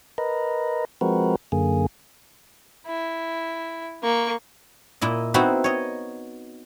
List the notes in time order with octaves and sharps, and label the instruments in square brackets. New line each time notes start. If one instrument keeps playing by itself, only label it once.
[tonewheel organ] A#4 B4 D#5
F3 G#3 C4 F#4 A#4 B4
F#2 D3 A#3 G#4
[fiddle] E4
A#3 C#6
[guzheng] A#2 E4 D#5
B3 C4 D#4 E4 F#4
C#5 D#5